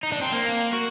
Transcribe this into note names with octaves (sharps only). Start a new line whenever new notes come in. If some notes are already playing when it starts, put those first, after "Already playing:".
D#4
D4
C4
A#3
F#4